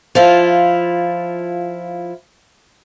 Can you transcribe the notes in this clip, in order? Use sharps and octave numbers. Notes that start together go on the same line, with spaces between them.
F3 E4 F4